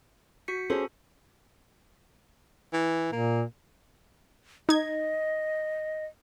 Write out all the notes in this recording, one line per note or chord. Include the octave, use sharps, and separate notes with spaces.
F#4 B6 C#7
C#4 G#4 A4 C5
E3
A#2 A#3
D#4 D#5 G#6